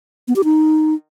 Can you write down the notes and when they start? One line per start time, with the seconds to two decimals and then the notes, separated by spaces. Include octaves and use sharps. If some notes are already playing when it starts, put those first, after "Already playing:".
0.28 B3
0.36 G4
0.44 D#4